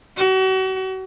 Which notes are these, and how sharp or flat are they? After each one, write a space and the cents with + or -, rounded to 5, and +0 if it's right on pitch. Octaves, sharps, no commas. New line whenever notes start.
F#4 +40